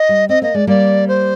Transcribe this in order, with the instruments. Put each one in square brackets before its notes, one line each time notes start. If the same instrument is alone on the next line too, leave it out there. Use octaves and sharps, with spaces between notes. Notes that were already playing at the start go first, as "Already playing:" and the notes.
Already playing: [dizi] D#5
[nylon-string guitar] G3
[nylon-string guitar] C4 [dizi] D#5
[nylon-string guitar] A#3 [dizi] D#5
[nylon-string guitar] G#3 [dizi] D5
[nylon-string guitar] G3 A#3 [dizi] D5
[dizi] C5